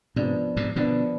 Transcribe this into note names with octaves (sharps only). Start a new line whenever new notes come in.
G#2 C3 F3 B3 D4
G#2 C3
B2 D3 F3 B3 D4